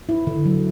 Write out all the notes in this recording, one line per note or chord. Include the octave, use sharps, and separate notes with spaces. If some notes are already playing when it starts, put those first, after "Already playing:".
E4
D3
F#3